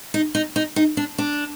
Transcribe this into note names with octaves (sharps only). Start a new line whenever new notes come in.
D#4
D#4
D#4
D#4
D4
D4